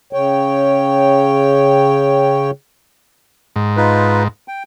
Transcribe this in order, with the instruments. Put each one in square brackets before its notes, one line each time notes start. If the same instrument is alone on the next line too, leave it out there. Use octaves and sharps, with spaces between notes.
[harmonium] C#3 C#5 G5
[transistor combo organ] G#2
[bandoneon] D#4 F4 B4
G5